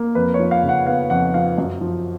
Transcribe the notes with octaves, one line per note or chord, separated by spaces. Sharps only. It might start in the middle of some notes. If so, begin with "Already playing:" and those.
Already playing: A#3
F2 B4
C#5
F3
F5
C#3
F#5
B3 F5
F2 F#5
F3 F5
F#2
F3